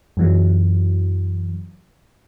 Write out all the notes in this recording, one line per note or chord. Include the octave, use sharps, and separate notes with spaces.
F#2 E3 F#3